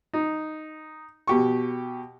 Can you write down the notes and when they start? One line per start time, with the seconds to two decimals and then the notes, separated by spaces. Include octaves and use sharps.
0.13 D#4
1.27 B2 G4 C#6